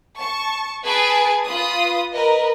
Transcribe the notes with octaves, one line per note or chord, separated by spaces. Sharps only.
A5 C#6
G#4 B4 G#5 A5 D7
F4 B4 B5 D#6
A#4 B4 D#5